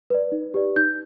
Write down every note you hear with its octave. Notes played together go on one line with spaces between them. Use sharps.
B4 D5
D#4
G4 B4 D5
D#4 G6